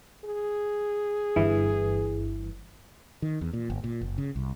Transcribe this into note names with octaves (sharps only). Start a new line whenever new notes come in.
G#4
G1 G2 E3
D#3
E2
A#2
G1
A#2
F#1
C#3
C2